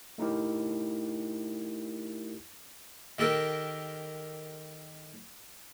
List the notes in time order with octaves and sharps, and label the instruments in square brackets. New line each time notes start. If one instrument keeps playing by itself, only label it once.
[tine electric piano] A3 D#4 E4 G4 A#4
[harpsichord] D#3 G4 A4 A#4